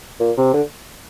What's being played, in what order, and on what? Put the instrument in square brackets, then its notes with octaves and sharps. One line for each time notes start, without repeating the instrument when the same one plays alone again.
[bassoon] A#2
C3
D3